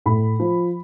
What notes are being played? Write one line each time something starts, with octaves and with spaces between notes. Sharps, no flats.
A2 B5
F3